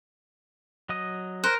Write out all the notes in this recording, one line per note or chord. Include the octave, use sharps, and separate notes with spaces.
F#3 D#5 D#6
A#4 C5 F#6